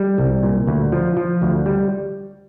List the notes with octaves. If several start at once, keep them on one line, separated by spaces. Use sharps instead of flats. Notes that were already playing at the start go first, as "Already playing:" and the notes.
Already playing: G3
C2
A#2
D2
F3
F3
D2
G3